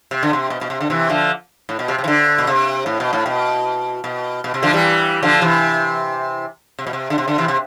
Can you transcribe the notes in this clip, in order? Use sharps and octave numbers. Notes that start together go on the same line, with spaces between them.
C3
D3
C3
B2
B2
C3
D3
C3 E3
D3 F3
A2
B2
C3
C3
E3
D3
B2
C3
A2
B2
A2
B2
B2
B2
C3
D3 F3
E3 G3
D3 F3
C3 E3
C3
B2
C3
D3
C3
D3
C3 E3
C3